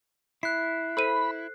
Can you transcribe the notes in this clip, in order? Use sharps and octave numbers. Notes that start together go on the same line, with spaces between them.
E4 F#6 C7
A4 C5 B5 D#7